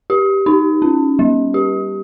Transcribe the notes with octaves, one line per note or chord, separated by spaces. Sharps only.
G4
D#4
C#4
G3
G4